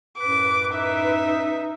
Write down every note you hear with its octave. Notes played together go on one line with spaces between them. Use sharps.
F#2 A2 B4 D6
D#4 E5